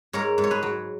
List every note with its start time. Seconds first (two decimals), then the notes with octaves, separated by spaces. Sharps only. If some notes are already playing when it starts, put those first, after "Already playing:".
0.13 G#2 A#4 C#5
0.38 G#2
0.44 C#5
0.51 G#4 B4
0.63 F#3